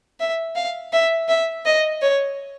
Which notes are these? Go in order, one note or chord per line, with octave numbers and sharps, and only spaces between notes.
E5
F5
E5
E5
D#5
C#5